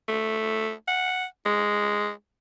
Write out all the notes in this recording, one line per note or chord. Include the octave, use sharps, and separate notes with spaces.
A3
F#5
G#3